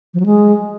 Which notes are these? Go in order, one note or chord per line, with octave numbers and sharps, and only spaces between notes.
F3
F#3
G#3